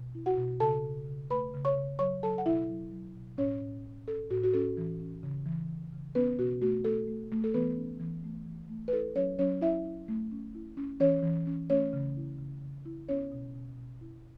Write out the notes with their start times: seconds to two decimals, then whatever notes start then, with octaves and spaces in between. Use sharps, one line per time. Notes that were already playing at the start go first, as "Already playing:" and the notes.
Already playing: B2
0.15 E4
0.26 F#4 F#5
0.37 B2
0.60 C#3 A4 A5
0.85 C#3
1.07 C#3
1.30 A3 B4 B5
1.54 C#3
1.65 C#5 C#6
1.76 C#3
1.99 F#3 C#5 C#6
2.23 F#3 A4 A5
2.38 F#5
2.46 B2 E4 E5
2.69 F#3
2.92 F#3
3.15 B2
3.38 A2 C#4 C#5
3.61 A2
3.85 C#4
4.07 C#4 A4
4.31 A2 F#4
4.43 F#4
4.54 C#4 A4
4.77 E3
5.00 C#4
5.23 C#3
5.46 E3
5.69 E3
5.92 C#3
6.15 B3 C#4 B4
6.39 B2 F#4
6.62 A3 F#4
6.85 A3 A4
7.08 A3
7.32 A3
7.44 A4
7.54 E3 B3 B4
7.77 C#4
8.00 E3
8.24 A3
8.46 E3
8.69 A3
8.88 B4
8.93 E4 A4
9.16 F#3 C#4 C#5
9.39 F#3 C#4 C#5
9.62 E4 E5
9.85 E4
10.08 A3
10.31 C#4
10.55 E4
10.77 C#4
11.00 E3 C#4 C#5
11.23 E3
11.47 C#4
11.70 A3 C#4 C#5
11.93 C#3
12.17 E4
12.39 C#3
12.62 C#3
12.85 E4
13.08 B3 C#4 C#5
13.32 B2
13.55 B2
13.77 B2
14.01 E4